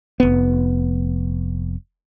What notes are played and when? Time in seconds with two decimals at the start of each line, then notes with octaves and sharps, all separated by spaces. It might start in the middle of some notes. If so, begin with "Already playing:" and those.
0.20 F1 B3